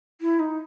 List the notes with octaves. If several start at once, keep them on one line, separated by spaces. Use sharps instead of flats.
E4
D#4